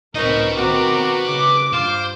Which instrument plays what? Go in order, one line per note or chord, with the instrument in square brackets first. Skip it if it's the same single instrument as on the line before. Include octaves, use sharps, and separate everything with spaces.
[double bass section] C#2 A2 C4 [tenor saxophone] D#4 [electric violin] A#4 C#6 [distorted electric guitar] B4 D#5
[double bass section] D#3 B3 C4 [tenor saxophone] F#4 [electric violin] A#5 D6
[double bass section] C#3 [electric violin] D6
[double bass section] G2 [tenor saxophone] F4 [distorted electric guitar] C5